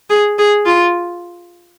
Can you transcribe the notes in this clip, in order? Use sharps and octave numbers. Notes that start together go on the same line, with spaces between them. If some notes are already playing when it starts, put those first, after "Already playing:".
G#4
G#4
F4